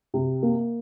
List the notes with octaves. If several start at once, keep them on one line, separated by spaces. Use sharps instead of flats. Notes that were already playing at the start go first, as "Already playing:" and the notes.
C3
A#3